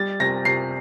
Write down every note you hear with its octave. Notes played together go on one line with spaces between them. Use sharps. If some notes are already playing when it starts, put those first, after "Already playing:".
Already playing: G3 A6
C3 A#6
C3 C7